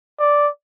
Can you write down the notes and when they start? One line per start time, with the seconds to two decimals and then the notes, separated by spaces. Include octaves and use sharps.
0.20 D5